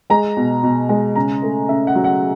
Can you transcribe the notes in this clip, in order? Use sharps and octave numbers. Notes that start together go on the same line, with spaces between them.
G#3 A#5
B2
B2
G#3
C#3 A#5
A3
C#3 E5
F#5
F#3
F#5